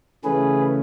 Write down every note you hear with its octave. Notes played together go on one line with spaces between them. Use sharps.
C#3 E3 A3 C#4 G#4 B4